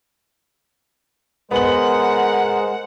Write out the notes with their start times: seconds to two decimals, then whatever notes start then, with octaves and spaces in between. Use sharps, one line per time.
1.51 G#3 B3 A#4 C5 F#5 F#7